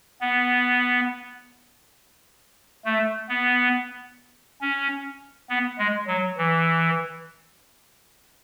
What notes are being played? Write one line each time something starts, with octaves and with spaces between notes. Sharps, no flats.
B3
A3
B3
C#4
B3
G#3
F#3
E3